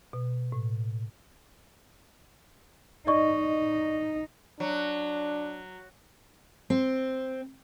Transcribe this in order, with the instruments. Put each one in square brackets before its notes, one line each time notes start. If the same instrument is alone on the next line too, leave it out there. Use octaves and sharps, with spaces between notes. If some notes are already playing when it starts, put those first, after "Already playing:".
[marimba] B2
A2
[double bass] D#4 [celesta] D5 D#5 C#6
[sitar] F#3 [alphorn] D4
[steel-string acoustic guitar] C4